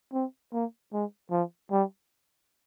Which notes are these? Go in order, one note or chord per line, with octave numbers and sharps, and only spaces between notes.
C4
A#3
G#3
F3
G3